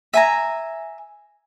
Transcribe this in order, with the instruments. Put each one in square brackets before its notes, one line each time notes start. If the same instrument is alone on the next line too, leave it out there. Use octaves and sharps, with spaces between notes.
[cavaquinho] E5 G#5 A#5